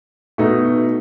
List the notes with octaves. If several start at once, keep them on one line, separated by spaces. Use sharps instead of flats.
B2 A3 D#4